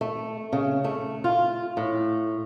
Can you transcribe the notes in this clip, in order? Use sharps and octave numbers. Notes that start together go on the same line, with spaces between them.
A3
C#3
A3
F4
A2